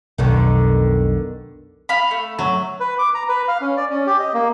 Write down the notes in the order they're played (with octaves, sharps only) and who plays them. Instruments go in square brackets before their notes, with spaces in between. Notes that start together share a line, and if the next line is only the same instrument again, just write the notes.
[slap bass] B1 F2 [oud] B2 D3 D#3
[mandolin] F5 B5
A3
[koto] F#3
[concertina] B4
D6
A#5
B4
F5
C#4
D5
C#4
G4
D#5
A#3